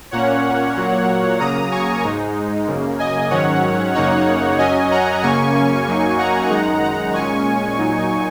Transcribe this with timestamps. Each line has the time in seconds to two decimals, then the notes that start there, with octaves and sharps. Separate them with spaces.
0.11 A#2 A#3 C#4 C#5 F#5
0.76 A#2 F#3 A#3
1.39 C#3 F#3 A#3 A#5 D#6
1.71 G#5 C#6
2.03 G#2 G#3 D#4
2.67 F#2 C#3 A#3
2.99 D#5 G#5
3.30 G#2 D#3 F#3 C#4 C#5 F#5
3.94 F#2 C#3 A#3 D#4 C#5 F#5
4.58 F#2 F#3 C#4 D#5 G#5
4.91 F#5 A#5
5.23 F#2 C#3 A#3 C#4 G#5 C#6
5.86 F#2 F#3 A#3 D#4
6.18 F#5 A#5
6.50 F#2 D#3 G#3 D#4 F#5 A#5
6.82 F#5 A#5
7.13 A#2 G#3 C#4 G#5 C#6
7.78 A#2 F#3 D#4